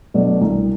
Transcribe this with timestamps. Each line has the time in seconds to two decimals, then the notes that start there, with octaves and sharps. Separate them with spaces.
0.14 B2 F#3 A3 D4
0.41 C2